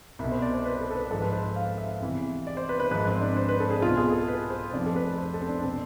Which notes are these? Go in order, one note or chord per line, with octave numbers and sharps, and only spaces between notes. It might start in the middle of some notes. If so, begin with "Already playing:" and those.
C2 B2 E5
C5
D5
C5
B4
A4
A4
B4
G#1 G#2 F3 A4
B4
C5
F5
E5
E2 C3 E3
D5
C5
B4
B4
G#1 G#2 F3 B4
C4
D4
C5
B4
A4
G#4
C2 B2 F4
G#4
A4
B4
C5
F1 F2 C3 F3 D5
A4
B4
C5
A4
C4
D4
B2 C4